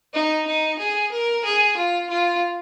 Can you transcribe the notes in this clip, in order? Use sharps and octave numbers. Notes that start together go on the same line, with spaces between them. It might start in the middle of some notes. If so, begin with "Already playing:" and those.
D#4
D#4
G#4
A#4
G#4
F4
F4